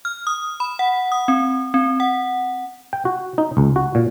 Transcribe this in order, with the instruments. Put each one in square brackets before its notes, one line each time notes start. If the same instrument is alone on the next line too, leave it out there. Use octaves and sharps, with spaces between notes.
[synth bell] F6
D#6
B5
F#5
D#6
C4
C4
F#5
[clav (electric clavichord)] G5
F#4
D#4
C#2
F#4
A#2